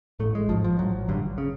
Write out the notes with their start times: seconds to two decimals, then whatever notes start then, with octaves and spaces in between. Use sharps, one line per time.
0.20 A1 A2 A3
0.35 G#3
0.49 A1 G#2 F3
0.64 F3
0.78 A1 A2 F#3
1.08 A1 G2 D3
1.38 C#3